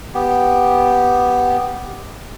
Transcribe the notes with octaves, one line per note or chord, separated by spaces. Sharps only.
B3 G4